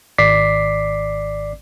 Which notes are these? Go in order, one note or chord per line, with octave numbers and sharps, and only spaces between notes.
G#1 D5 D6 B6 C7